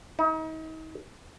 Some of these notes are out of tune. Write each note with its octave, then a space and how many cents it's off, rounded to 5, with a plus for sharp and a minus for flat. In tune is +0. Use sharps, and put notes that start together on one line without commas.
D#4 +35